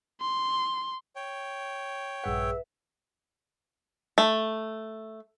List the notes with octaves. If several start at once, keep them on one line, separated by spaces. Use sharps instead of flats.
C6
C#5 G5
A#1 G2 G#4 B4 E5 F#5 E6
A3